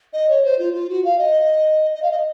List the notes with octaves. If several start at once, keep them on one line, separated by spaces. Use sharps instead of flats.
D#5
C#5
C5
F4
F4
F#4
F5
D#5
D#5
F5
D#5